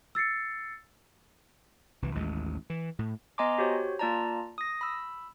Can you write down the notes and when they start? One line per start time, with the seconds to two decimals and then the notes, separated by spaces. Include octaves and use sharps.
0.15 E6 A6 C7 C#7
2.02 C2 E3
2.15 A1 D#2 G#3
2.70 E3
2.99 A2
3.38 B3 D#5 G#5 A#5 C6 D6
3.58 F#4 G4 C5 C#5
3.99 A#3 F4 D5 A5 A#5
4.58 D#6 A#6
4.81 B5 E6